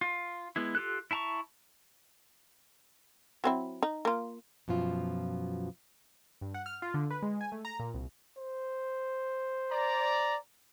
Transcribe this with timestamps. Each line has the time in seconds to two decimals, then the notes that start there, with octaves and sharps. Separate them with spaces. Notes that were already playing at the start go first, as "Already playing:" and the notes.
0.01 F4
0.56 G#3 B3 E4
0.75 F4 G4 A4 F#6
1.11 E4 E5 A5 A#5 C#6
3.44 F#3 C4 E4
3.83 D#4
4.05 A#3 F4
4.68 F#2 B2 F3 F4
6.41 G2
6.54 F#5
6.66 F6
6.82 F4
6.94 D3
7.11 B4
7.22 G#3
7.41 G#5
7.52 A3
7.65 A#5
7.79 A#2
7.94 C2
8.37 C5
9.71 D5 A#5